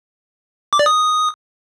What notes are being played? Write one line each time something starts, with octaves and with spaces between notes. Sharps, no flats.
D6
D5
D#6